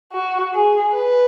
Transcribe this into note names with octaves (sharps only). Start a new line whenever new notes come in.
F#4
G#4
B4